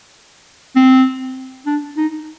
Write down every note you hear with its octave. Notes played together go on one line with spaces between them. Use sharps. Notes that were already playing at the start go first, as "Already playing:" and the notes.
C4
D4
D#4